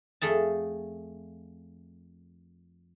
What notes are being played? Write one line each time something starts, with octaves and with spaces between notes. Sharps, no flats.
F2 A3 G#4 A5